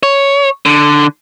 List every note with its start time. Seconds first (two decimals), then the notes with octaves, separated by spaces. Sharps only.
0.03 C#5
0.66 D3